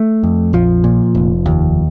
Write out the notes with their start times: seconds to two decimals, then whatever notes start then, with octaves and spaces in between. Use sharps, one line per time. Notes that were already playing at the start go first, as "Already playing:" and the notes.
Already playing: A3
0.23 F2
0.53 A#1 F3
0.84 A#2
1.15 F1
1.46 D#2